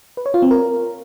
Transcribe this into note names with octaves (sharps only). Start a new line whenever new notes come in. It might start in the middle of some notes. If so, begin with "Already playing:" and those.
B4
C#5
F4
C4
A#4